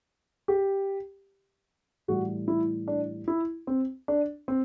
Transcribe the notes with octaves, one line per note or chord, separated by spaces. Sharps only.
G4
A2 E3 G3 F#4
E4
D4
E4
C4
D4
C4